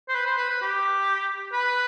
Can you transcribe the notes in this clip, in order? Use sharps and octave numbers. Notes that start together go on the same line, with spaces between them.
C5
B4
C5
B4
B4
G4
B4